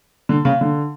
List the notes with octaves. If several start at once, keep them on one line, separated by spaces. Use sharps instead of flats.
D3
C#3
D3